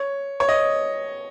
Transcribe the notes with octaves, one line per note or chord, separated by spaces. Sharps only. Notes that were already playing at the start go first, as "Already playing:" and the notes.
Already playing: C#5
C#5
D#5